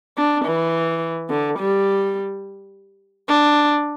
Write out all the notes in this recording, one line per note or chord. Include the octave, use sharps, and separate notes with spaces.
D4
E3
D3
G3
D4